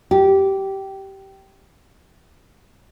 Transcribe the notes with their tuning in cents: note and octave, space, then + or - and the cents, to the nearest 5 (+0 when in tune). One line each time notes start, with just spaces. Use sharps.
G4 -15